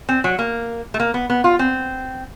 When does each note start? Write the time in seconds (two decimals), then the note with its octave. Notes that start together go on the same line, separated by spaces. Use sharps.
0.09 C4
0.24 F#3
0.39 A#3
0.94 A3
1.00 A#3
1.14 B3
1.30 B3
1.44 F4
1.59 C4